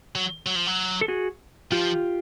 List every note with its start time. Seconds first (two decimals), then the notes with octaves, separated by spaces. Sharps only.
0.15 F#3
0.46 F#3
0.56 F3
0.67 F#3
1.01 A4
1.08 F#4 G#4
1.71 F3 F4 G4